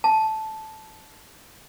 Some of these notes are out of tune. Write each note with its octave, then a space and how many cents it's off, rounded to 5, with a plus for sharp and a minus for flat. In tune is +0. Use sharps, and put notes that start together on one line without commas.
A5 -10